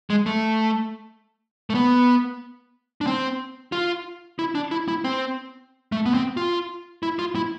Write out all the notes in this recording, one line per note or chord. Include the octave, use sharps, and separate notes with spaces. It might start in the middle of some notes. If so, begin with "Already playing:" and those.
G#3
A3
A3
B3
D4
C4
F4
E4
D4
E4
E4
C4
A3
B3
C4
F4
E4
F4
E4